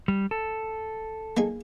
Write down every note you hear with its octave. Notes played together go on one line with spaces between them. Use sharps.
G3
A4
A#3 D#4 G#4